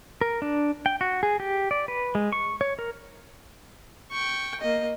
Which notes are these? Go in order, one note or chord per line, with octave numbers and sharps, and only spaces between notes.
A#4
D4
G5
F#4
G#4
G4
D5
B4
G#3
C#6
C#5
A#4
G5 C#6
A#3 D#5